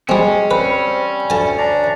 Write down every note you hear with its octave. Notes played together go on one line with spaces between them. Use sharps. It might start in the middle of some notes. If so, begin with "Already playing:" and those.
G3 G#3 C4 C#4
G3 C4 B4
D2 G#5 A5
D4 D5 A#5